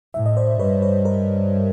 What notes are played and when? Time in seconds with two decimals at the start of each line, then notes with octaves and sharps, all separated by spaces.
0.14 A2 E5
0.26 D#5
0.37 C5 D5
0.59 G2 B4 C#5
0.82 B4 C#5
1.05 A#4 C5